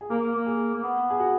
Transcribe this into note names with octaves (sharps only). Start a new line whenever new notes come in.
G#4
A#3 A#4
A#3
A#3
G#4
A#3
B3
G#4
F#4